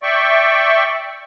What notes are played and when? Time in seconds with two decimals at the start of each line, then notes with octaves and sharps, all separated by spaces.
0.03 D5 E5 G5 C#6